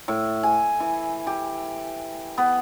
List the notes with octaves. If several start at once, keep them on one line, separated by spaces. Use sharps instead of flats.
A2
G#5
E3
G4
B3